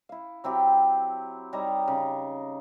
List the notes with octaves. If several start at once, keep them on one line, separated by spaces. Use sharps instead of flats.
E4 F5
F#3 C4 E4 G4
G3 D#4 C#5 A#5
C#3